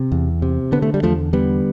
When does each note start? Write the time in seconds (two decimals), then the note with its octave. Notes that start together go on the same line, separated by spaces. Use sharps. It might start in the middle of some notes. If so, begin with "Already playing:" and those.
Already playing: C3
0.12 E2
0.42 C3
0.72 D3 B3
0.82 A3
0.94 G3
1.03 E2 F3 A3
1.33 D3 G3 B3